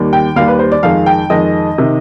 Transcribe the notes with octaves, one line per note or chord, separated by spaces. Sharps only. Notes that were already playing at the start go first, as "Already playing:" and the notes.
Already playing: D#2 D#3 G3
G5
D#2 D#3 G3 F5
B4
C5
D5
F2 D#3 G#3 F5
G5
F2 D#3 G#3 D#5
C3 D#3